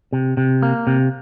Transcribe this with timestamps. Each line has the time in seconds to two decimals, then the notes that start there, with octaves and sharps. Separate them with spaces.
0.13 C3
0.37 C3
0.63 A#3
0.87 C3